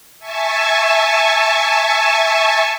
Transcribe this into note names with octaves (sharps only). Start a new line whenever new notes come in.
E5 G#5 A5 C#6